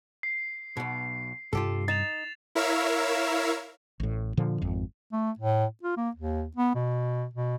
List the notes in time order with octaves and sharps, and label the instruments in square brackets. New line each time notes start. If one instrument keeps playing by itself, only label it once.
[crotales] C7
[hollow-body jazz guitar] B1 B2
[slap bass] G2 C3 G3 [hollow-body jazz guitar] F4 G4 A4
[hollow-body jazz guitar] D#4 [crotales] A6 E7 F7
[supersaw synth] E4 A#4 C#5 E5 F5 E6
[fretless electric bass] A1 A2
A#2 D3 F3
G#1 F2
[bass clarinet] A3
A2
F4
A#3
D#2
B3
B2
B2